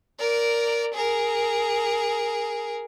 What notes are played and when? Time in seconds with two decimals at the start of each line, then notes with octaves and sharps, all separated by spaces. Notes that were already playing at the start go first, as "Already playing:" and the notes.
0.19 A#4 D5
0.94 G#4 A#4